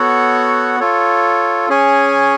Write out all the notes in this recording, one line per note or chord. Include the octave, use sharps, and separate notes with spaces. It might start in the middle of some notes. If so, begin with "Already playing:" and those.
Already playing: B3 F#4 A4 C#5 F#5
F4 A4 C#5
C#4 G#4 C#5 G#5